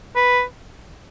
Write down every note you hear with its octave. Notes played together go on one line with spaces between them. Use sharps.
B4